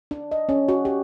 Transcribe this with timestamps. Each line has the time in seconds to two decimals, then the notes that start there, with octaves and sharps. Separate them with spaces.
0.11 D4
0.32 D#5
0.49 C#4
0.69 F#4
0.85 G4